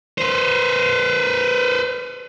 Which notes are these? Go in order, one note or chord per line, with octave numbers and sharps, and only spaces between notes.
B4 C5